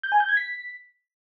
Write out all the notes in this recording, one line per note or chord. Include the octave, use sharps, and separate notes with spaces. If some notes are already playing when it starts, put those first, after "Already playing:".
G6
G#5
G6
G#6
B6